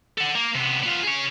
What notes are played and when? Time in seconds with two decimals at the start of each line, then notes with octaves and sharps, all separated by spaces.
0.18 A4 F#5
0.35 A#3
0.55 C3 B3
0.83 B3 F4
1.03 G#4 C#5